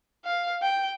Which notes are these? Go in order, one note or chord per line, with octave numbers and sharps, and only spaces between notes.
F5
G5